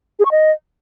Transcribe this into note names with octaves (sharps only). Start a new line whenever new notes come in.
G#4
C#6
D#5